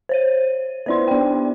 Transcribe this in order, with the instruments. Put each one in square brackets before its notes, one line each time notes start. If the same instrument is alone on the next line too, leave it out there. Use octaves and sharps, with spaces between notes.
[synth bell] C5 C#5 D#7
[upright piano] B3 E4 [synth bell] C5 D5 C6
[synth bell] B3 G5 [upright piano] D4 G4